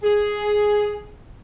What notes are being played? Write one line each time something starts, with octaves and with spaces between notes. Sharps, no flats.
G#4